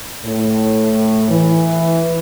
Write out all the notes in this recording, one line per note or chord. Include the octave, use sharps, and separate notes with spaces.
A2
E3